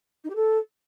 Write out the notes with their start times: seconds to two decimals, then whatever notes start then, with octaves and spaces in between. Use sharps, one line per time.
0.24 D#4
0.30 G4
0.36 A4